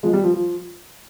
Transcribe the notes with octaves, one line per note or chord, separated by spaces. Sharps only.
F3 G#3
G3
F3
F3